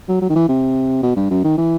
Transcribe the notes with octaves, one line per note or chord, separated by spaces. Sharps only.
F#3
F#3
D#3
E3
C3
B2
G2
F#2
D#3
E3